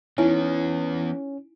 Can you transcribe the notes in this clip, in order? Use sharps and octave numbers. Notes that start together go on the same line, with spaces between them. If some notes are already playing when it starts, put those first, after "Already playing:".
E3 B3 C#4 D#4 E4 G#5